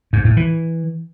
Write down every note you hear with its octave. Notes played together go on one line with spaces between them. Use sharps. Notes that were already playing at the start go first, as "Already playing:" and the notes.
G#2
A2
E3